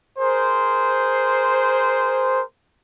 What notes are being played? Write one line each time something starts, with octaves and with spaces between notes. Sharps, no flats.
G#4 A#4 C5